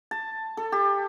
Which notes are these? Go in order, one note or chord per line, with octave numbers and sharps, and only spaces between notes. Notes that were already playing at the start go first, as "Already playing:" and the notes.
A5
A4
G4